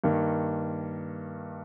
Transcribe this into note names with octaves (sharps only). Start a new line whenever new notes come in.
G2 D#3 A#3